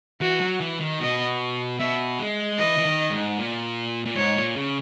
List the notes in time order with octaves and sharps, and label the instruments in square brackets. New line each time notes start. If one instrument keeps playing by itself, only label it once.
[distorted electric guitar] E3 [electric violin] F#4
[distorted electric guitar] F#3
E3
D#3
[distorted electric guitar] B2 [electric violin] D#5
[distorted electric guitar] B2 [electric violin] E5
[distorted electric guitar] G#3
[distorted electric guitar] E3 [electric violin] D#5
[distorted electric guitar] E3
D#3
G#2
A#2
A#2
[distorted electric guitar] G#2 [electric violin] C#5
[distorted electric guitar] A#2
C#3